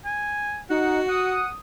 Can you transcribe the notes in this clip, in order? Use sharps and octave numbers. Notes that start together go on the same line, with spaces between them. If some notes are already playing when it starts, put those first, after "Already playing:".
G#5
D#4 F#4 F#5
F#5 D#6